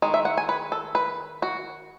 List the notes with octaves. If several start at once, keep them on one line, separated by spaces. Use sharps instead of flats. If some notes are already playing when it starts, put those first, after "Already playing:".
D#3 G#3
E5
F#5
G#5
B4
A4
B4
F#4